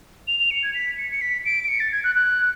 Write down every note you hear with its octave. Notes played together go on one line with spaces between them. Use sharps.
F7
F7
C#7
G#6
B6
C#7
C#7
B6
D7
D7
C#7
A6
G#6
F#6
F#6